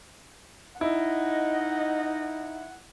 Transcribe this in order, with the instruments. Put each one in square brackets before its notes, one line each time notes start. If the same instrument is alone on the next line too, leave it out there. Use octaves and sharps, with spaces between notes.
[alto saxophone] D#4 [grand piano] E4 [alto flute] D#5 [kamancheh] F#5